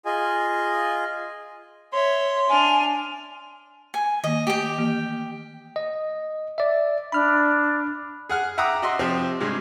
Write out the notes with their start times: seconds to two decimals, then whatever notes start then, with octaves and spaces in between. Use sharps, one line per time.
0.06 F4 G#4 D#5 G#5
1.93 C#5 E5 C6
2.49 D4 G#5 F6
3.94 G#5
4.24 D#3 A#3 D#5
4.47 A3 G4 G5
4.78 E3 A#3
5.76 D#5
6.58 D5 E5
7.12 D4 B5 F6
8.29 G#4 F#5 F6
8.58 E5 F#5 G5 A#5 D6 D#6
8.82 F#4 D#5 E5 C6
8.99 C3 F3 C4 G4
9.40 G2 C3 G#3